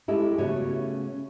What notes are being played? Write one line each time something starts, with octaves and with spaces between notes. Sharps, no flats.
G#3 E4 G4 A4
C#3 A3 B3 C#4 F#4